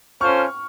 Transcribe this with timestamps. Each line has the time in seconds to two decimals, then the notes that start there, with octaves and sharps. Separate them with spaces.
0.21 C#4 F4 A4 C5 C#6 F6